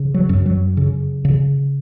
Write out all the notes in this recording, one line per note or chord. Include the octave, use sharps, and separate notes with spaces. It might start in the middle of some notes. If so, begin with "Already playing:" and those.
Already playing: C#3
F#3
F#2
F#3
C#3
C#3